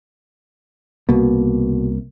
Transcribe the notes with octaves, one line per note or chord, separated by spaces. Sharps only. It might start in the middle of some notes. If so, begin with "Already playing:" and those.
C2 B2 A#3